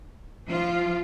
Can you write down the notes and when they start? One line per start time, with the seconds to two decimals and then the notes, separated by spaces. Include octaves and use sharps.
0.49 F3 F4